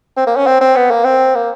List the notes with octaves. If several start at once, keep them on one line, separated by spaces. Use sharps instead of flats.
C4
A#3
C#4
C4
C4
B3
A#3
C4
A#3